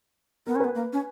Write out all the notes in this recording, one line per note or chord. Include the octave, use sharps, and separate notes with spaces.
B3 A#4
C#4
B3 B4
A#3
C#4